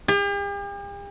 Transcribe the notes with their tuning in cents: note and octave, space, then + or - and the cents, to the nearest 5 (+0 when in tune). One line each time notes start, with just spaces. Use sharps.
G4 +45